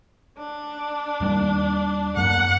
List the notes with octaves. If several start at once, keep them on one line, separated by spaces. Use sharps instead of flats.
D4
D#2 G3 A#3
F#2 A#3 F#5